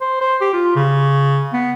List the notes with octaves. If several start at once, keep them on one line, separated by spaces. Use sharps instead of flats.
C5
C5
G4
F4
C#3
B3